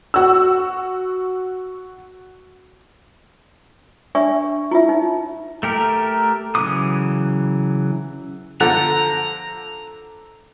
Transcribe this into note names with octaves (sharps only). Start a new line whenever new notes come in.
F#4 E6
D4 D5 E5 C#6
E4 F4 E5
D#4
A3 G4 A#4
C#3 E3 F#3 D6 D#6
D3 F3 F#5 A#5